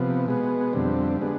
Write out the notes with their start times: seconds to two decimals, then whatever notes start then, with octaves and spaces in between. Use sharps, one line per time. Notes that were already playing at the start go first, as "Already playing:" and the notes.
Already playing: C3 F3 B3
0.26 B2 G#3 B3
0.73 F2 D3 G3 C4
1.21 D3 G#3 B3